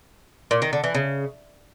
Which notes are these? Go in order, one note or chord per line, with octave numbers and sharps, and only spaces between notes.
A#2
D#3
D3
E3
C#3